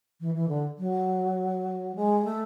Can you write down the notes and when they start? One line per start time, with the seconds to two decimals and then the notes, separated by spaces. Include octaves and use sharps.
0.21 E3
0.34 E3
0.49 D3
0.78 F#3
1.96 G#3
2.24 A3